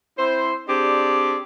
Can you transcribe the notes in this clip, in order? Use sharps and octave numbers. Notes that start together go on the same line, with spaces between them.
C4 E4 C5
C4 D4 G4 G#4 D5